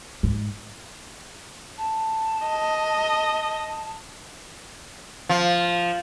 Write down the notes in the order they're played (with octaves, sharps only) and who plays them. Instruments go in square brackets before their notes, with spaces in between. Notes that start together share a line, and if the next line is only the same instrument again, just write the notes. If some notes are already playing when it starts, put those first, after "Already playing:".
[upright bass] G#2
[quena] A5
[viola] D#5
[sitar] F3